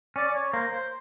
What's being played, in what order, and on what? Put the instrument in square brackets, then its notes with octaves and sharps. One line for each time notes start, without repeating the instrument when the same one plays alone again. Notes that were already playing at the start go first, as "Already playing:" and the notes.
[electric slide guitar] C#4 [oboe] D5
[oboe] D5
C#5
[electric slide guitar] A#3 [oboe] C5
[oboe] C5